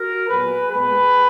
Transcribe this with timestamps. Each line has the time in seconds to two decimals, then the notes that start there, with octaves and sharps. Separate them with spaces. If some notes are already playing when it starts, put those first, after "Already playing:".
Already playing: F#4 A#4
0.28 A#2 F#3 B3 G#4 B4
0.71 A#2 G#3 B3 G#4 B4